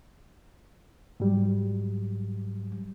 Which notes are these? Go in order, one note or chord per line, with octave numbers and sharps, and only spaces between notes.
G#2 F#3 G3